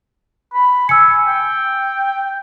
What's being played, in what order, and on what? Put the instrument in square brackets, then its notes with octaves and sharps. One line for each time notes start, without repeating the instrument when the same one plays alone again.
[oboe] B5
[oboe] G#5 [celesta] E6 C#7
[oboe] G5